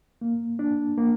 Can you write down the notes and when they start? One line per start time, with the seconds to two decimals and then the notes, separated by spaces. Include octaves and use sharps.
0.21 A#3
0.59 D4
0.98 A#3